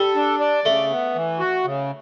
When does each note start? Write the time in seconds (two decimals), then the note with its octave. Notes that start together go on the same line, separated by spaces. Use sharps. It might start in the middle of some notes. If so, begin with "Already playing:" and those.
Already playing: G3 A4
0.15 D4
0.40 D5
0.65 C#3 A3
0.90 B3
1.15 E3
1.39 F#4
1.65 C#3